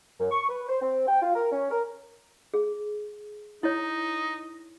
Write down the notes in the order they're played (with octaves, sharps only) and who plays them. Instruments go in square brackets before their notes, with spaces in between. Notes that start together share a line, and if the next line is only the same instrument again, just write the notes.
[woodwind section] F#2
C#6
B4
C5
C4
G5
F4
A#4
C#4
A#4
[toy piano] G#4
[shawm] D#4 [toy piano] E4 C#5